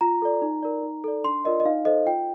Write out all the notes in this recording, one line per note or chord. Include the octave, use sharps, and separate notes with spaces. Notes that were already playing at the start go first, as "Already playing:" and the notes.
F4 A#5
A4 D5
D#4
A#4 D5
D#4
A4 D5
D4 C6
F4 A#4 D5 D#5
D#5
D#4 F5
A4 C5 D#5
F4 G5